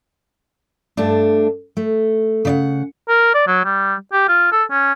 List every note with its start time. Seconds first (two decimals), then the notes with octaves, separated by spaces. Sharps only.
0.97 G2 A3 D4
1.77 A3
2.45 C#3 D5 F#5
3.09 A#4
3.34 D5
3.47 F#3
3.65 G3
4.13 G4
4.28 F4
4.52 A4
4.71 C#4